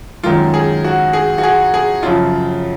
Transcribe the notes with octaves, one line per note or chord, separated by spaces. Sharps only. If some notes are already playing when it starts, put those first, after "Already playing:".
F#2 D#3 G#3 F4
G#4
F#4
G#4
F#4
G#4
G#4
F#2 C#3 F3 F4